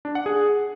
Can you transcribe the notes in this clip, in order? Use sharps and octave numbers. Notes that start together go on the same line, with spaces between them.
D4
F#5
G#4